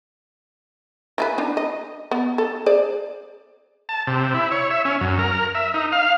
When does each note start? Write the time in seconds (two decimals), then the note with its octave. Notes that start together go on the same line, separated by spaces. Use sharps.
1.18 E3 E4 B4
1.38 D4 D#4
1.57 D#5
2.11 B3
2.38 A4
2.66 G#4 C5 D5
3.89 A5
4.07 C3
4.34 E4
4.51 C#5
4.70 E5
4.85 C#4
5.01 F#2
5.19 A#4
5.55 E5
5.74 D#4
5.92 F5